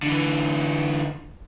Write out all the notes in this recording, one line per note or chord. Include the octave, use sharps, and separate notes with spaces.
D3 E3